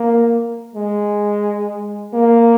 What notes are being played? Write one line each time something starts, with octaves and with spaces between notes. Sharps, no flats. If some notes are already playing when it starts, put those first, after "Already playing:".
Already playing: A#3
G#3
A#3